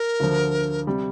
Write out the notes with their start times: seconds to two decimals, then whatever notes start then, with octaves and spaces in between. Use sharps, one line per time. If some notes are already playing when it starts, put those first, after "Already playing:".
Already playing: A#4
0.20 D2 D3 F3
0.87 C3 G3